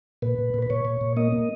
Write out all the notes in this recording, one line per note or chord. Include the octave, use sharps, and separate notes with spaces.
A#2 B4
A#2
A#2
B4
A#2 C#5
A#2
A#2
A#3 D#5
A#3